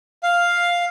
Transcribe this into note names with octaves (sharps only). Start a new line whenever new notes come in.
F5